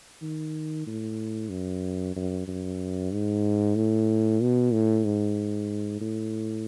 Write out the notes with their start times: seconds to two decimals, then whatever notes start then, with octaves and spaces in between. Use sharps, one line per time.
0.22 D#3
0.87 A2
1.50 F#2
2.16 F#2
2.48 F#2
3.12 G#2
3.75 A2
4.41 B2
4.73 A2
5.05 G#2
6.01 A2